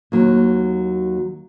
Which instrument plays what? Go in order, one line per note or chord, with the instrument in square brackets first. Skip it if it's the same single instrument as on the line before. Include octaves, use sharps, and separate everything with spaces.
[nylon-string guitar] D#2 F#3